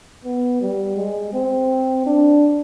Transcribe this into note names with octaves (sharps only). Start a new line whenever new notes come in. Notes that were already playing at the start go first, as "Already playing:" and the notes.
B3
G3
G#3
C4
D4